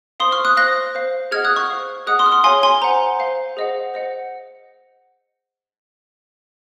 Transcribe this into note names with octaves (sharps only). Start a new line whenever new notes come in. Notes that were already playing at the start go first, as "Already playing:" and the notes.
C5 F5 C6 D#6
C#6 F6
D#6 F#6
C5 F5 F#6 A#6
C5 F5
G#4 D#5 F#5 F6 G#6
D#6 F#6
C#6 F6
C5 F5
G#4 D#5 F#5 D#6 F#6
C6 D#6
F6
C6 D#6
G#4 C#5 F5 G#5 C6
G#5 C6
C5 F#5 A#5
C5 F5
G#4 C5 D#5 F#5
C5 D#5 F#5